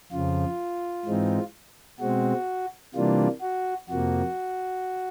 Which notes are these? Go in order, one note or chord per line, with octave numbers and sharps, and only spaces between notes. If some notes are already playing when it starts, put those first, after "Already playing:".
F2 C#3 F3 F4
G#2 E3 G#3 C4 D#4
B2 G#3 C4 F#4
C3 E3 G3 A#3 D4 F4
F#4
F2 C3 F3 A#3 F#4